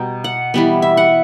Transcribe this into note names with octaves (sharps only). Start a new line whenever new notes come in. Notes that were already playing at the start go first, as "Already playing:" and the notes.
Already playing: B2 G3 G5 A#5
F#5
E3 G3 B3
E5
F#5